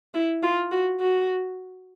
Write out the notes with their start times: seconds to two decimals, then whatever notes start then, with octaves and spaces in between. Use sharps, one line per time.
0.14 E4
0.43 F4
0.72 F#4
1.00 F#4